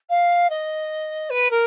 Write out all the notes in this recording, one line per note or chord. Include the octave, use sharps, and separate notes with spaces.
F5
D#5
B4
A#4